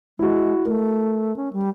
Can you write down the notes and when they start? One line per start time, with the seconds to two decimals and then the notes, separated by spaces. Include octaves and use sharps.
0.19 G#3 E4 F#4
0.65 A3 A#4
1.36 C#4
1.53 G3